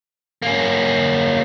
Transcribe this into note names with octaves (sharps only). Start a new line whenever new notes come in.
A#3 C#4